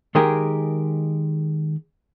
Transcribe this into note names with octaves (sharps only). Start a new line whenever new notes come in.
D#3 G#3 G4 G#4 A#4